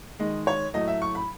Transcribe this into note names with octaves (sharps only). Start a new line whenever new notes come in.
D#3 G#3 D#5
C#5
A2 F#3 A3 D#5
E5
C#6
B5